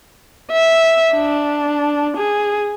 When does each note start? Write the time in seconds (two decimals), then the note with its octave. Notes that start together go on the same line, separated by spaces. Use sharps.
0.52 E5
1.14 D4
2.17 G#4